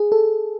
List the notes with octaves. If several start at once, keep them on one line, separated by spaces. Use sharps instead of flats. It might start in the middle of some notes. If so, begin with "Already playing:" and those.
Already playing: G#4
A4